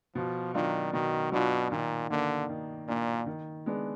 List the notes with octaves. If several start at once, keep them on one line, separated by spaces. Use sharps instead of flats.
B2 F3
D#3 F#3 D4 F4
B2 D#3
B2 F#3 D4 F4
A#2 D#3
D3 A#3 D4
D#3
A#2 A#3 D4
D#3
G#3 B3 D4